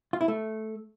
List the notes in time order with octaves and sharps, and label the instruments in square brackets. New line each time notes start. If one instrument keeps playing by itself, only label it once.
[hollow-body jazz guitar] F4
E4
A3